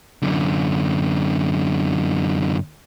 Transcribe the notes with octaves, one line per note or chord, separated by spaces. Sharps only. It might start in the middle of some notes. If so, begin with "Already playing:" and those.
F#2 D3